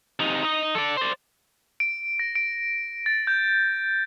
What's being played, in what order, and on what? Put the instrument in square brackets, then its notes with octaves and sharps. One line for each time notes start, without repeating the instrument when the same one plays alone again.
[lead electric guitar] C3 D#4
D#4 D#5
A4 D5
C5 D5
[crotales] D7
A#6
D7
A6
G6